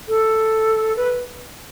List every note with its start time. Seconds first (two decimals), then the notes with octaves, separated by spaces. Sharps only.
0.08 A4
0.96 B4